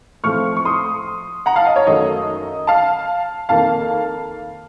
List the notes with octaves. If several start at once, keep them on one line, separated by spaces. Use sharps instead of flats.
A2 F3 A3 C4 C#6 F6
C#6
C6 D#6
F#5 A#5
F5 A5
D#5
C#5
F#2 D#3 A3 D#5
F5 A5
F2 D#3 A#3 F5 A5